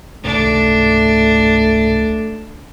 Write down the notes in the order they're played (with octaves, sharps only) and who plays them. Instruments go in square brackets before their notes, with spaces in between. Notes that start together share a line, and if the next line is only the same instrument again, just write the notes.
[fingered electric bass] G#1 G#2 C3 [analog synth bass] C#2 [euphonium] A3 [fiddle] D4